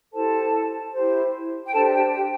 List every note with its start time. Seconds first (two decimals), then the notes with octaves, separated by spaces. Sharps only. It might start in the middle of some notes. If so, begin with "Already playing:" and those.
0.12 E4 G4 A4 C5 A5
0.94 E4 G4 C5
1.65 G5
1.73 D4 G4 A4 C5 A5
1.92 G4 G5
2.13 G4 G5